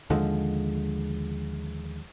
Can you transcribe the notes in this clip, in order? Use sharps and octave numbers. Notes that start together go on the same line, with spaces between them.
D#2 D3 F3 G#3